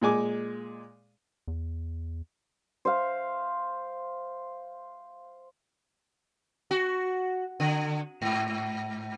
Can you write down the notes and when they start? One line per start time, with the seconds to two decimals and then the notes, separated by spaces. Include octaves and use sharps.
0.02 A#2 G#3 G#5 D6
1.48 E2
2.85 C5 E5 F5
6.71 F#4
7.60 D3
8.22 G#2